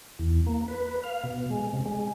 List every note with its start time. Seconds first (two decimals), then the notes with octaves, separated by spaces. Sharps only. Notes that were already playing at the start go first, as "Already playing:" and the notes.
0.19 E2
0.46 A#3
0.68 B4
1.04 F5
1.24 B2
1.50 G#3
1.73 C3
1.86 G#3